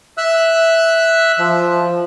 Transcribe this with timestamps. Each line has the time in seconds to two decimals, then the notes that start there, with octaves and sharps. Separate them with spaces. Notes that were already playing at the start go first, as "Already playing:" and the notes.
0.18 E5 E6 F#6
1.39 F3